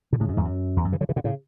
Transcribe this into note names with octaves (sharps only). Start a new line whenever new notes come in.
B2 D3
A2 C#3
F#2
E2 G#2
F#2
E2
F#2
C#3 E3
D3 F#3
C#3 E3
B2 D3
A2 C#3